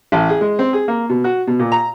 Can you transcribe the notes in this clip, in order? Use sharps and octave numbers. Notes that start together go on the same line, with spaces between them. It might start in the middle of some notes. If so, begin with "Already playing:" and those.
A1
G#4
G#3
C4
G#4
A#3
B2
F#4
B2
A#2
A#5